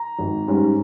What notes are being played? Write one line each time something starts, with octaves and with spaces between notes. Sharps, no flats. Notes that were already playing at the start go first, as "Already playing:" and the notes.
Already playing: A#5
G#1
G#2 G3 C#4